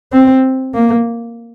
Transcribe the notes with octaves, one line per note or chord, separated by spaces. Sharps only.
C4
A#3